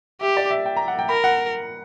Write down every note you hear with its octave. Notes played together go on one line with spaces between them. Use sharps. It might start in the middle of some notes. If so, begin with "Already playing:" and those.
G4 E5
D5
E5
G5
A#5
F#5
G5
A#4 B5
F#5